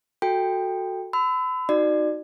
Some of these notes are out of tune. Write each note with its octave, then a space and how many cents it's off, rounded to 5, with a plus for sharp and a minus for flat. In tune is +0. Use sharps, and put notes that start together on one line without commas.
F#4 +0 A4 +5 G5 +15
B5 +40 E6 -10
D#4 +0 F#4 +0 D5 +25